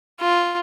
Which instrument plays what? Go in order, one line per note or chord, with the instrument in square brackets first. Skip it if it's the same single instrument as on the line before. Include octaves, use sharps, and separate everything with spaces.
[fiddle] F4